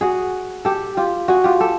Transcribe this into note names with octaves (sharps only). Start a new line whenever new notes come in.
F#4 G#4
G4 A4
F4 G4
F#4 G#4
F4 G4
G4 A4